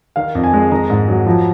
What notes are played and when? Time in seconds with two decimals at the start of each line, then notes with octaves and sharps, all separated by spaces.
0.16 D#3 F5
0.35 F2
0.44 G#5
0.53 G#3
0.71 D#3 A#5
0.90 G#2
1.08 F#3
1.26 F3